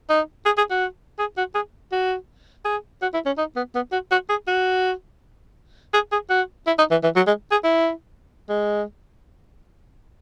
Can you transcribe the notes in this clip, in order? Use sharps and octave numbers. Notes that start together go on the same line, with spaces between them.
D#4
G#4
G#4
F#4
G#4
F#4
G#4
F#4
G#4
F#4
E4
C#4
D#4
B3
B3
F#4
F#4
G#4
F#4
G#4
G#4
F#4
E4
D#4
E3
E3
F#3
G#3
G#4
E4
G#3